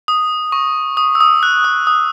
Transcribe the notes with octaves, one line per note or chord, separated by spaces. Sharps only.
D#6
C#6
D#6
E6
D#6
F#6
D#6
D#6